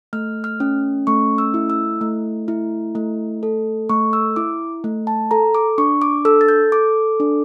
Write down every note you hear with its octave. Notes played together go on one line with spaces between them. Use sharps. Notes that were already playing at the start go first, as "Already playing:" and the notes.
A3 F6
F6
C#4
A3 C#6
E6
E4
E6
A3
E4
A3
A4
A3 C#6
E6
E4 D6
A3
A5
A4 A#5
D6
D4 C#6
D6
A4 E6
A6
G6
A4 D6
D4